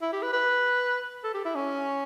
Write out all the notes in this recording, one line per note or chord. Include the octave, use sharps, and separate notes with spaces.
E4
G4
B4
B4
A4
G4
E4
C#4